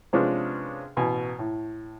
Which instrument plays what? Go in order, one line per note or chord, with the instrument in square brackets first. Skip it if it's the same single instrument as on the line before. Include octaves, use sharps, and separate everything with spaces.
[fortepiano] C3 F3 G#3 B3 C#4 D4
A1 B2 G#5
A2